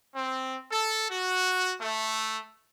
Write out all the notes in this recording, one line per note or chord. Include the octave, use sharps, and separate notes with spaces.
C4
A4
F#4
A3